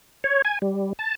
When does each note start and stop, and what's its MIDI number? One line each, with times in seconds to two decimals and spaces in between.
0.24 0.42 73
0.45 0.59 80
0.62 0.93 55
0.99 1.15 81